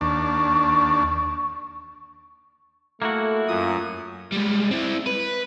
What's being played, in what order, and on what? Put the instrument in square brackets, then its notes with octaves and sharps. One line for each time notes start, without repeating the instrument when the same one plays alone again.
[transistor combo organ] D#2 D4 [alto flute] C#6
[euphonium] A3 [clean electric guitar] A#3 E4 F#4
[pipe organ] F#2 D#6 [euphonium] F4
[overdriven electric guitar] G3 G#3
C4 E4
B4